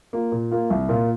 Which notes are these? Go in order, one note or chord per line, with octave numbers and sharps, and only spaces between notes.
A#3 F4
A#2
A#3 F4
C2
A#2 A#3 F4